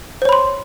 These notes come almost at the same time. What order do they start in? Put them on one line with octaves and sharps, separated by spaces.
C5 C#5 B5 C6